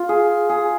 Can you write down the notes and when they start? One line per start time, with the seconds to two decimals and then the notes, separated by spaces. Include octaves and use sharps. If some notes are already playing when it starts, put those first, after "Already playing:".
Already playing: F4
0.09 G#4
0.49 G#4